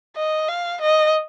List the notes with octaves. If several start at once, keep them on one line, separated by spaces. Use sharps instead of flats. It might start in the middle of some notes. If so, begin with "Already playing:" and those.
D#5
F5
D#5